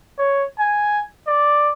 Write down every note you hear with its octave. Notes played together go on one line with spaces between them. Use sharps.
C#5
G#5
D5